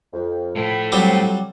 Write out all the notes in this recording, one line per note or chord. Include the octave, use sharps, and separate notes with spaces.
F2
A2 F3 E4 A4
F#3 G3 C4